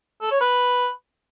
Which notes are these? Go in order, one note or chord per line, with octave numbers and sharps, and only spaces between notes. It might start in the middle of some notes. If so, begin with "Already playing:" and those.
A4
C#5
B4